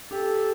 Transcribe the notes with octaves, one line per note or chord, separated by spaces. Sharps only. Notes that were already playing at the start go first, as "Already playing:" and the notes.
G4 A4